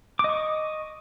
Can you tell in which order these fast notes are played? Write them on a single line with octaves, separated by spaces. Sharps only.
D6 D#5 C#6